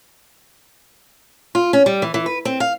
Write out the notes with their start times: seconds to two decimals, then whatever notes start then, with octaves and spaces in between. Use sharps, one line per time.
1.55 F4
1.73 C#4
1.86 G3
2.02 E3
2.14 E3
2.26 B4
2.45 C4
2.60 F5